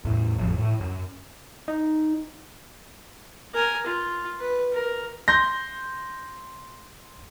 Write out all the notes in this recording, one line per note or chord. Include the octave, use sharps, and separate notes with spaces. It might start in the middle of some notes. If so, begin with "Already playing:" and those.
E2 A2
A1 F2 F3
A2
F#2
D#4
A#4 G#5
F4
B4
A#4
C6 G6 A#6